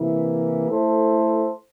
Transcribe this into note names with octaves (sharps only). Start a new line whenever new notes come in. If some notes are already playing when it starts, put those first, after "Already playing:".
Already playing: C3 E3 A#3 E4
A3 E4 A4 C5